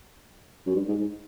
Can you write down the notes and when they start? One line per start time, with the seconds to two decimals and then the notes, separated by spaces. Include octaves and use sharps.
0.67 F#2
0.76 G2
0.88 G#2
0.99 G#2